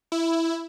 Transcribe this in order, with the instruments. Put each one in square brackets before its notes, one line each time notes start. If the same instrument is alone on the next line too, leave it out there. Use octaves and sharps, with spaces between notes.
[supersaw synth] E4